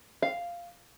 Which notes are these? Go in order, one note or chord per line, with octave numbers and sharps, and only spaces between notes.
F5